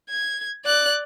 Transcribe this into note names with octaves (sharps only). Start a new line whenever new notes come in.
G#6
D5 F#6